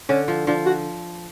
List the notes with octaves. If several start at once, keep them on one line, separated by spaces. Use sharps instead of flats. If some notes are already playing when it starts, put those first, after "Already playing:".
D3 C#4
F3
F3 D4
F#4